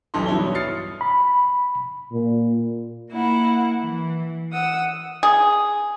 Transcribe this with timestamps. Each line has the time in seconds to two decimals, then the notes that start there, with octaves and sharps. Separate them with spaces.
0.14 D#1 B1 E3 D#4 A4 C6
0.26 G2 B2 E4 C#5 G7
0.55 D#6 F6 A6 C7 C#7
1.01 B5
2.12 A#2
3.10 A#3 E4 F#5
3.79 E3
4.52 F#5 D#6 E6
5.23 G#4